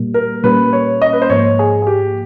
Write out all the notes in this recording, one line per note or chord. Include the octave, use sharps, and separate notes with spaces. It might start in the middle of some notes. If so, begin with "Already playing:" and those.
Already playing: A#2 G3 A#3
A#4
A#2 G3 A#3 C#4 B4
C#5
D#5
B4
C5
G#2 F3 A#3 C#5
G#4
G#4
G4